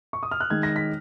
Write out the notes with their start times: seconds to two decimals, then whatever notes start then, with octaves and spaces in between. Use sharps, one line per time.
0.13 C#6
0.23 D#6
0.31 F6
0.40 F#6
0.50 D#3 G#3 D#4 G#6
0.63 A#6
0.76 B6